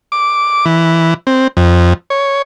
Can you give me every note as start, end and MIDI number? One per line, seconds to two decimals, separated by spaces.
0.12 0.65 86
0.65 1.14 52
1.27 1.47 60
1.57 1.93 41
2.10 2.42 73